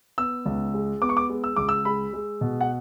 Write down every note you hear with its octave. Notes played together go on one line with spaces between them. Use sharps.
B3 E6
C#2
G#3
B3 D6
C#6
D6
G#3
E6
C#2 D6
E6
G#3 B5
G#3
B2
F#5